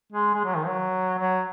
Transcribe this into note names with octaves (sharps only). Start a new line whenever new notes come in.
G#3
G#3
F#3
D#3
F#3
F#3